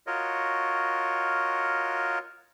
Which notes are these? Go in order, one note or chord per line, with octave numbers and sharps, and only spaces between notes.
F4 F#4 A#4 C#5 D#5